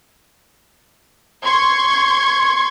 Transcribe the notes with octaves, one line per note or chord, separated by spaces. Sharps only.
C6 C#6 G#6